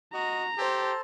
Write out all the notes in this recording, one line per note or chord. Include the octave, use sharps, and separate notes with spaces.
F#4 D#5 A#5
G4 A4 C5 A5